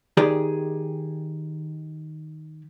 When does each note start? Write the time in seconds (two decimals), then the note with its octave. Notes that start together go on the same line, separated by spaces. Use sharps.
0.17 D#3 G4 G#4 D5